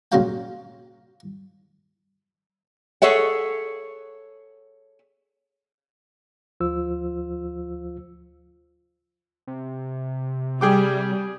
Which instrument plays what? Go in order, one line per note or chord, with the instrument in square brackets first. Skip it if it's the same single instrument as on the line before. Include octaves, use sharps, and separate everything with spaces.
[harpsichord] F#2 A#2 C#3 F#4 F5 G5
[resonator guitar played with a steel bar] G#4 A4 C#5 E5 F#5
[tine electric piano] D2 F3 F4 C5 E6
[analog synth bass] C3
[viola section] G3 [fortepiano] G#4 G5 D6